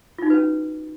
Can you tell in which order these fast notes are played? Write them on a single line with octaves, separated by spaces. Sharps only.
F4 D#4 F#4 B4 C#4